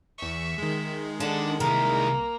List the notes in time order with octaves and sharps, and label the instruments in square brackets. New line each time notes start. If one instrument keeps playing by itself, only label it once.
[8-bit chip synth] E2 C#6 [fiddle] E5
[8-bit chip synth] D#3 G#3
[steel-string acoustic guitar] D3 [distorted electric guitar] D4 [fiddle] A4 F#5
[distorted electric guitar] C2 E4 [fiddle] A#3 [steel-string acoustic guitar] A#4